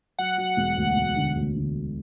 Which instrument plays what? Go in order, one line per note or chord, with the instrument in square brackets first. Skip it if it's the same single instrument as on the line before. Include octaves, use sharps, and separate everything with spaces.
[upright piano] F#3 [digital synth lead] F#5
[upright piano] F#3
E1
D2
E1
D3
D2
D3